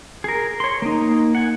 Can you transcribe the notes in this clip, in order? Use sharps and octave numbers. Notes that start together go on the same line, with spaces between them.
G#4 A#4
C#5 C6
A#3 D#4
F#5 G#5